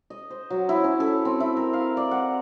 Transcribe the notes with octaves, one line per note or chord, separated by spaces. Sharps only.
D#5
C5
F#3
E4
C#4
A4
C4
E4
A#4
F5
D5
F#5